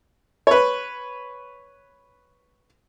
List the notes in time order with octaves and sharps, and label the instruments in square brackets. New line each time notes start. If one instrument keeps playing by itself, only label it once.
[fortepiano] B4 C#5